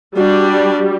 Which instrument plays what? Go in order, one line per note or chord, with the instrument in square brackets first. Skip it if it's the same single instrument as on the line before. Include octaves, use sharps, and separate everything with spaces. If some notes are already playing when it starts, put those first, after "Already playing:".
[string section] G3 [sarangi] D4 [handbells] F#4